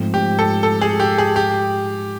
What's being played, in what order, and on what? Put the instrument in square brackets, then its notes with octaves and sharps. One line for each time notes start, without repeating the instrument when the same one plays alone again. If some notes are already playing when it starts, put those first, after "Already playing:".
Already playing: [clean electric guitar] G#2 F3 A3 C4
[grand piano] G4
A4
A4
G#4
G4
G#4
G4